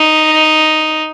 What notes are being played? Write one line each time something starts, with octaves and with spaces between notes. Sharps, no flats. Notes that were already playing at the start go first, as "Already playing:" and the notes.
Already playing: D#4